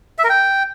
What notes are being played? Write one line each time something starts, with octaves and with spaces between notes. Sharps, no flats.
E5
A#4
G5